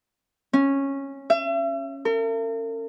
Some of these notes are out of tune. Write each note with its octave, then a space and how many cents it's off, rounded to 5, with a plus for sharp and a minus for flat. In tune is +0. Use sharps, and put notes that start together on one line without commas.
C#4 -10
E5 +40
A#4 -45